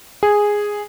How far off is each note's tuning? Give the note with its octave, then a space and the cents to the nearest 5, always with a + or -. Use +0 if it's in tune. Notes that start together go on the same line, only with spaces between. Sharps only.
G#4 -5